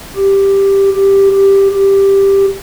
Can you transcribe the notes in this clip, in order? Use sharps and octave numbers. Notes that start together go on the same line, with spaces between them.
G4
G4
G4
G4